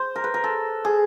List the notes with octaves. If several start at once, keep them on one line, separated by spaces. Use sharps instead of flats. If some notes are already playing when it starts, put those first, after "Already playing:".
Already playing: C5
A#4
B4
A#4
A4
G#4